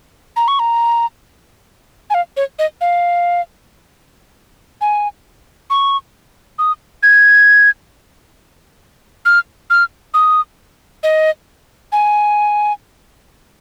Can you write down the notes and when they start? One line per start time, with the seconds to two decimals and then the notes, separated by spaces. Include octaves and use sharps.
0.36 A#5
0.48 C#6
0.59 A#5
2.10 G#5
2.14 F5
2.37 C#5
2.59 D#5
2.81 F5
4.81 G#5
5.70 C#6
6.59 D#6
7.03 G#6
9.26 F6
9.70 F6
10.14 D#6
11.03 D#5
11.92 G#5